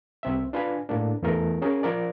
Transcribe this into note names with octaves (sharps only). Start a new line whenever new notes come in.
C2 C4 E5
D4 F4 B4 F5 G#5 B5
A2 A#3 D4
E2 E3 A3 A#4
C#4 G#4 A#4
F3 F4 A#4 D5